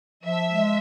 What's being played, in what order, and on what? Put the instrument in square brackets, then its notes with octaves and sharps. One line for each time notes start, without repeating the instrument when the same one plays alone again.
[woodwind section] F3 [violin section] E5
[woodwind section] G#3